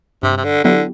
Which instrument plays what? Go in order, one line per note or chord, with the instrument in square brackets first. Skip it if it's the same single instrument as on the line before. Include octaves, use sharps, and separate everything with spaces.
[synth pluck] G2 [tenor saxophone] C3
[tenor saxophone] C3
D3
[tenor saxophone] D3 [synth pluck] F#3 B3 E4 G4